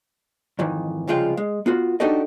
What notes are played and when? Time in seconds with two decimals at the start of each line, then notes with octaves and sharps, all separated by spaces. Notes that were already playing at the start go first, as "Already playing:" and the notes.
0.59 F2 G#2 D#3 E3
1.07 C2 C#3 F3 G#3 F4 G5
1.37 G#3
1.66 B3 F4 F#4
2.00 D4 D#4 F#4 G4 A4 D#5